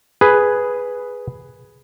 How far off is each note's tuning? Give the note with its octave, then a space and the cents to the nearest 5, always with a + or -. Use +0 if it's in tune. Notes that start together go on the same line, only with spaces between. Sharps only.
G#4 +0 B4 +0